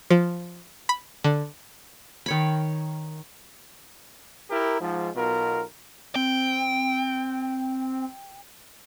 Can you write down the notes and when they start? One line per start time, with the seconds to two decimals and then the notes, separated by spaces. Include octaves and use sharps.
0.11 F3
0.89 B5
1.24 D3
2.26 D#3 C#5 B5
4.50 E4 G4 A#4
4.81 G#2 F3
5.15 B1 B2 F4 A#4
6.15 C4 G5